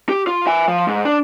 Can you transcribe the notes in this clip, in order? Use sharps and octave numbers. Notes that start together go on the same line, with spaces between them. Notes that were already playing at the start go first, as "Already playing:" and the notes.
G4
F4
E5 G#5
F3
G#2
D4